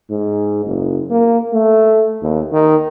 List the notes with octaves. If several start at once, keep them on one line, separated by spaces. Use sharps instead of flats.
G#2
F#1
A#3
A3
D#2
D#3